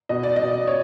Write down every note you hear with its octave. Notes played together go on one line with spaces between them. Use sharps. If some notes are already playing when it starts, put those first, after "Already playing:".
B2 D#5
D5
D#5
B2
C#5